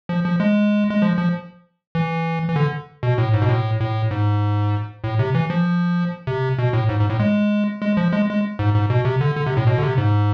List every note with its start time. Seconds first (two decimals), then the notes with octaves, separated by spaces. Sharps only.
0.09 F3
0.24 F3
0.40 G#3
0.91 G#3
1.02 F3
1.17 F3
1.95 E3
2.48 E3
2.56 D3
3.03 B2
3.18 A2
3.34 G#2
3.42 B2
3.49 A2
3.80 A2
4.11 G#2
5.04 A2
5.19 C3
5.35 E3
5.50 F3
6.27 C3
6.59 B2
6.73 A2
6.89 G#2
7.00 G#2
7.10 A2
7.20 G#3
7.82 G#3
7.97 F3
8.13 G#3
8.31 G#3
8.59 G#2
8.74 G#2
8.90 B2
9.05 C3
9.21 D3
9.36 D3
9.46 C3
9.57 A2
9.67 B2
9.78 D3
9.83 C3
9.98 G#2